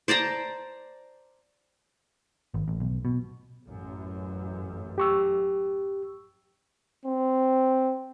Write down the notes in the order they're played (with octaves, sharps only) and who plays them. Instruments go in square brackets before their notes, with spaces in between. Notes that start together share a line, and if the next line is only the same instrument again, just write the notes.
[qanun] C5 D5 A5 A#5
[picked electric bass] G#1
A1
B1
B2
[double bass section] A1 F#2
[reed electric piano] G4 C#6 E6
[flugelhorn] C4